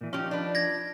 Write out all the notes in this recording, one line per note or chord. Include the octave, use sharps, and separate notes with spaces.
A#2 E3
F3 C#4 D#4 G4
D4 B4
G#6 A#6